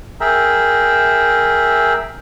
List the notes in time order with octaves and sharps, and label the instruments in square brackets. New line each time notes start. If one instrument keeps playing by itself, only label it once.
[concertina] G#4 A#4 E5 G5